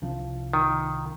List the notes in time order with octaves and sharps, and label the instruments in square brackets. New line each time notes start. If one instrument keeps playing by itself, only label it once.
[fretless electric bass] C2 F3 D4
[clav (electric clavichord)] D#3